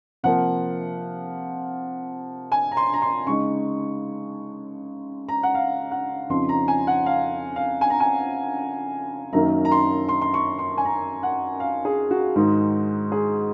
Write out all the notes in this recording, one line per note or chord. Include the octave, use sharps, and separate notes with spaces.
C3 F3 A#3 F#5
G#5
A#5
C6
A#5
C6
C#3 G#3 D#4 C#6
A#5
F#5
F5
F#5
F2 C#3 F3 C4 D#4 C6
A#5
G#5
F#5
F5
F5
G#5
A#5
G#5
F#2 D#3 F#3 A#3 D#4 A#5
A#5
C6
C6
C6
C#6
C6
G#5
A#5
F#5
F5
G#4
F#4
G#2 D#3 G#3 D#4
G#4